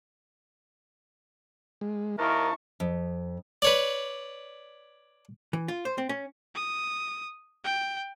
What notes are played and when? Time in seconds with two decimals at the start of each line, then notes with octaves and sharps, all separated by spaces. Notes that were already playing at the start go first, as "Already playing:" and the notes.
1.81 G#3
2.19 D#2 E4 A#4 A5 C#6
2.80 F2
3.62 B4 C#5 D5
5.53 E3
5.68 F4
5.85 C5
5.98 C4
6.09 C#4
6.55 D#6
7.64 G5